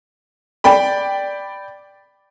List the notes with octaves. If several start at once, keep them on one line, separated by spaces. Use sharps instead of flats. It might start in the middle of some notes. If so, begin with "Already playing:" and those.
D5 G5 B5